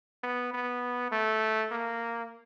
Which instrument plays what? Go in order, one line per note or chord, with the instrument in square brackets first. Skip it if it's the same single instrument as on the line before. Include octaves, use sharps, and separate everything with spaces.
[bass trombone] B3
B3
A3
A#3